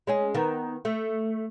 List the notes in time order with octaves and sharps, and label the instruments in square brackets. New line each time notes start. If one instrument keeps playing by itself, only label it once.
[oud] G#3 C#4 G#4
D#3 B3
A3